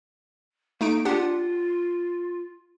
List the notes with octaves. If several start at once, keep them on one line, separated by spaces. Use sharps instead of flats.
A3 A#3 D#4 D7
D4 F4 G4 F#5